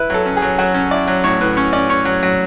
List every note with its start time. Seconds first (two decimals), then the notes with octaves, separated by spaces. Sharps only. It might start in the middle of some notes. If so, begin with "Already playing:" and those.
Already playing: E4 B4
0.10 F#3 A4
0.26 C#4
0.37 G#4
0.42 F#3
0.58 F#3 F#4
0.74 C#4
0.91 E4 D5
1.08 F#3
1.24 A2 C#5
1.41 A2 B4
1.57 C#4 C#5
1.73 C#4 D5
1.89 C#4 C#5
2.05 F#3
2.23 F#3